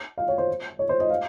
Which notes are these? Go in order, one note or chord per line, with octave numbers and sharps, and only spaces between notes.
F5
C#5
C5
C#5
C5
D#5
F5